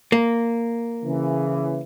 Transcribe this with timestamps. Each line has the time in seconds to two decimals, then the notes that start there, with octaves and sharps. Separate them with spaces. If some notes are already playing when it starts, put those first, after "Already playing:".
0.12 A#3
1.05 C#3 E3